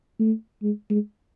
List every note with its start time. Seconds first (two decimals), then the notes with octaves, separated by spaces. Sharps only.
0.19 A3
0.63 G#3
0.90 G#3